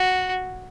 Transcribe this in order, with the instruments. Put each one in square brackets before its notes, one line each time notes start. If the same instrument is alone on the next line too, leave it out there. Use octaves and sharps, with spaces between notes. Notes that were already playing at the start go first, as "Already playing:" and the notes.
Already playing: [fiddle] F#4